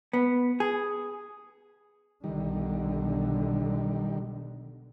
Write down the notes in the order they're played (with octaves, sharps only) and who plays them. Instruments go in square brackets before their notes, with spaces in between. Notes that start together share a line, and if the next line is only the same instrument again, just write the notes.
[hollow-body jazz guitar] B3
G#4
[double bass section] B1 D3 [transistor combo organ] D#3 G3